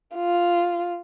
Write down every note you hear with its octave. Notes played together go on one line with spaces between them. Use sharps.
F4